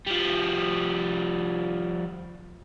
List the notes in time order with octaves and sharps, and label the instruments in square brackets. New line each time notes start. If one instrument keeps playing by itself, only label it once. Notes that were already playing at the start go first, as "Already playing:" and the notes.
[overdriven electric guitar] F3 G3